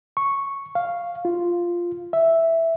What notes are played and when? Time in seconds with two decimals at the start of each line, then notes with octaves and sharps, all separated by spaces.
0.17 C#6
0.75 F5
1.25 F4
2.13 E5